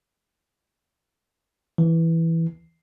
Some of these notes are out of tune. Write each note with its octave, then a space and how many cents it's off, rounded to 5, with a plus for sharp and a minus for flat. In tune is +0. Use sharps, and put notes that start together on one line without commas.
E3 -5